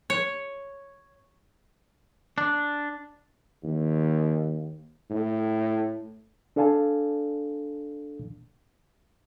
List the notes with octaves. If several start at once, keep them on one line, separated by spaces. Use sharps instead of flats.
C#5
D4
D#2
A2
D4 A4 D5 F5 G#5 A5